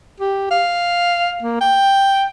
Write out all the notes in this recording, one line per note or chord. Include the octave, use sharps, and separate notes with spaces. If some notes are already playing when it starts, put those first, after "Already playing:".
G4
F5
A#3
G5